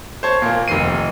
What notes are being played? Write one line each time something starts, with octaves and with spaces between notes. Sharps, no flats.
C5 C#5 A5 G#6
A#2 A#3
F1 D#3 C7 D#7